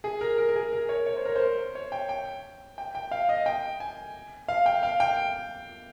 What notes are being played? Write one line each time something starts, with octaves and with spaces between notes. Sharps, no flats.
G#4
A#4
A#4
A#4
G#4
A#4
C#5
C#5
C5
A#4
C5
C#5
G5
G5
G5
G5
F5
D#5
G5
G#5
F5
G5
F5
G5